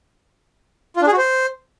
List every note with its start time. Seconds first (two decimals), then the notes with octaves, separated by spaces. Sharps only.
0.97 F4
1.02 D4
1.07 G#4
1.12 F#4
1.18 C5